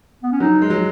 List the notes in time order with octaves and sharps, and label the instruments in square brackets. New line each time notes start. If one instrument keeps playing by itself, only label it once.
[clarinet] B3
C#4
[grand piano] F#3 [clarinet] D#4
[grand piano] G#3
F#3